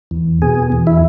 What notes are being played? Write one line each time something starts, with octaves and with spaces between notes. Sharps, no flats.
E2
B2 G#4
E2
E4